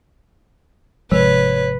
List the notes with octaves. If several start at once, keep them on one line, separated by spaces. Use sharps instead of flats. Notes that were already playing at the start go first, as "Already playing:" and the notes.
G#1 C3 F3 G#3 B4 C#5